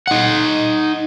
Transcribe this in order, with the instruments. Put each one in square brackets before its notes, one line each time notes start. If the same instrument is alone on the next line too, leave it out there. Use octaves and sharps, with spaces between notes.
[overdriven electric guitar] D#4 F#5